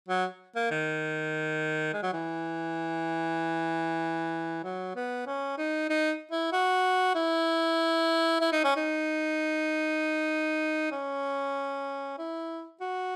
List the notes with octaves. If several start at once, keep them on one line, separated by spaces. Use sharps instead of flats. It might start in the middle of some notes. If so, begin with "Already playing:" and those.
F#3
A#3
D#3
G#3
F#3
E3
F#3
B3
C#4
D#4
D#4
E4
F#4
E4
E4
D#4
C#4
D#4
C#4
E4
F#4